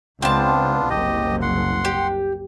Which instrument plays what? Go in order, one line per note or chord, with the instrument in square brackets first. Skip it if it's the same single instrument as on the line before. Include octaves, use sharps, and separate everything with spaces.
[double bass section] C#2 [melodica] B3 D4 F4 [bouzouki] C4 A5
[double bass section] F#1 C2 [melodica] G4 D#5
[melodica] F#5 C6
[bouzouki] G4